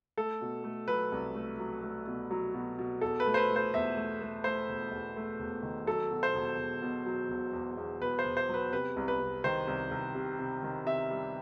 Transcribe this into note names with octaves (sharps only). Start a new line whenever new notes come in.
A3 A4
B2
A3
F#3 B4
C2
A3
F#3
A3
B2
F#3
B2
B2
E2 A4
B4
A3
C5
B4
A3
C5
E2 E5
A3
A3
A3 C5
E1
E2
A3
E1
D#3
F#3 A4
B2
C5
E1
E1
B2
F#3
E1
E2
E2
E1 B4
C5
E1
C5
F#3
B4
C3 B4
C2
B4
C2
D#3 C5
C2
C2
C3
C3
D#3
C3 E5
G3